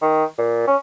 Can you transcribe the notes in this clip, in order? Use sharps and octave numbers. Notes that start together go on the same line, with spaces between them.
D#3
A#2
C#4